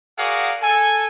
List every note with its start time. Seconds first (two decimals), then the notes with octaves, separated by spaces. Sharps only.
0.19 F#4 G#4 A#4 D5 F5 F#5
0.62 A4 G#5